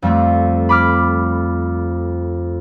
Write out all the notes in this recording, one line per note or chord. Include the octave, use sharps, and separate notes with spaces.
F2 G3 A3 C4
B5 D6 F6